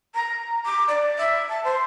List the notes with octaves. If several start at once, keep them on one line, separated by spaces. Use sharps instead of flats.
A#5
D6
D5
E5
A5
C5